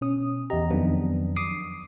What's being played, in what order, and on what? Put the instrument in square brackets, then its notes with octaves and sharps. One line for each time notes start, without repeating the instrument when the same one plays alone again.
[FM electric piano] B2 C#4 D#6
[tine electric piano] E2 A#5 [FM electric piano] G4 D#5
[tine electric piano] F2 D4 [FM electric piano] D#3 F#3 B3
[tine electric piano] D6 D#6 C7